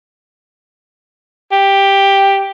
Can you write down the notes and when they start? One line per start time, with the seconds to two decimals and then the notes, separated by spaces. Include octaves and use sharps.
1.52 G4